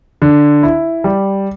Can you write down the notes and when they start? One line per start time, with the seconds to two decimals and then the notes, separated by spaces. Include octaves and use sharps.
0.22 D3
0.63 E4
1.04 G3